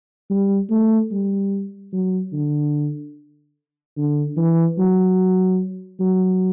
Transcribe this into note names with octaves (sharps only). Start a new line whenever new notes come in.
G3
A3
G3
F#3
D3
D3
E3
F#3
F#3